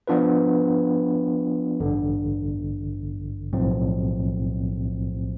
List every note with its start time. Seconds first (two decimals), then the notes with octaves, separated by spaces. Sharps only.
0.07 F3 B3 D4 F4 B4
1.80 A1 G2 D3
3.53 B1 A2 F3 C4